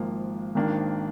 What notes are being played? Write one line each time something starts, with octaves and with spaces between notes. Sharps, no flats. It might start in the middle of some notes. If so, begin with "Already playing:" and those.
Already playing: G#1 G#2 F3 A#3
G#1 G#2 D#3 A#3 D4